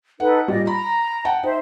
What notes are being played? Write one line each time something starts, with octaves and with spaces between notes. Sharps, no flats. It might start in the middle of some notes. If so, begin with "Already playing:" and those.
D#4 A4 B4 F#5
A#2 G3 D5 D#5
A#5 B5
F#5 G5 A5
D#4 C5 E5